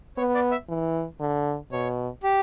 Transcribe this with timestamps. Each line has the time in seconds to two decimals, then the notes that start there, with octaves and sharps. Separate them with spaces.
0.17 B3 C#5
0.35 D5
0.51 E5
0.69 E3
1.20 D3
1.72 B2 C#5
2.23 G4